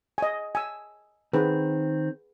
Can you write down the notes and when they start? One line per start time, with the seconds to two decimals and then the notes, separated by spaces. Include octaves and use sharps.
0.18 D#5 G#5
0.55 G#5 E6
1.33 D#3 C4 G#4 B4